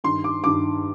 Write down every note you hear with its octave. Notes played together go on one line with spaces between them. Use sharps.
G2 D#3 C6
D6
G2 D#3 D6